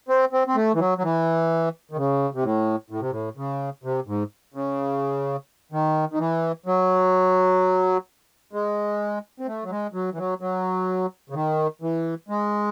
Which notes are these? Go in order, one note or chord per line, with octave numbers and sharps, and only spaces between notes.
C4
C4
C4
A3
E3
F#3
F#3
E3
D#3
C#3
C3
A2
A2
C3
A2
C#3
C3
G#2
C#3
D#3
D#3
E3
F#3
G#3
C4
A3
F#3
G#3
F#3
E3
F#3
F#3
C#3
D#3
E3
G#3